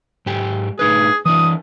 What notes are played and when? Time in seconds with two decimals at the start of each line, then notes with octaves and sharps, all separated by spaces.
0.26 G#2 G4 G#5
0.79 A2 D#4 G#4 B4
1.25 E3 D4 E4 D#6